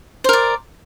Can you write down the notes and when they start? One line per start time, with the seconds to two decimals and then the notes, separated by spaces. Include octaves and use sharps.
0.24 C5
0.29 A#4
0.33 D5